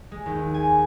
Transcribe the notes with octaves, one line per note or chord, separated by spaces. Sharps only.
G#3
D#2
G#5